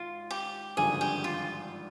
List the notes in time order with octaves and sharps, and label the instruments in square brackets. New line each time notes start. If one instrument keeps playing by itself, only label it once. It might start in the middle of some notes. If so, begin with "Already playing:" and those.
Already playing: [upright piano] G#1 [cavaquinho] F4
[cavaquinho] G4
[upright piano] G#1 G2 D3 F3 [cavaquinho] G#4
[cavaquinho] G4
F4